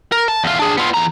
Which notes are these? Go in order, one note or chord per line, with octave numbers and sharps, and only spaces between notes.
A#4
A5
E2 F4
D4 G#4
B3 F4
E2 A#5